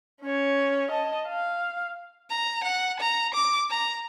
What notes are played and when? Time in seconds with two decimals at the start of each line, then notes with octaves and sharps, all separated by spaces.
0.22 C#4 C#5
0.91 D#5 A5
1.28 F5
2.30 A#5
2.64 F#5
3.00 A#5
3.34 D6
3.70 A#5